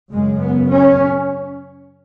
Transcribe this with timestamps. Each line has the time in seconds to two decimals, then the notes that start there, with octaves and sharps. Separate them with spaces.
0.11 F#2 C#3 G#3
0.40 B3
0.70 C#4